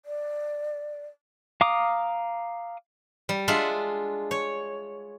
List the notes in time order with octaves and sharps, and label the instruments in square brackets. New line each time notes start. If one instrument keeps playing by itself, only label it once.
[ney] D5
[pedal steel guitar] F5 A#5 D6 D#6
[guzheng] G3
G#3 D4 F4 E5 F#5
C#5